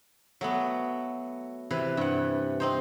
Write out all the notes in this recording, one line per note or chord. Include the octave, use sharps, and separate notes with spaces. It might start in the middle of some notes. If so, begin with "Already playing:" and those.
F#3 A3 B3
C3 E3 B4
G2 F#5
C4 D#4 C5